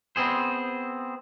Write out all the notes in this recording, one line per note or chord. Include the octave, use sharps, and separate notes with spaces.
B3 C4 G#4 C5